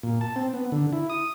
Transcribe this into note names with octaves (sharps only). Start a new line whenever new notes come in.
A#2
A5
C4
B3
D3
E4
D#6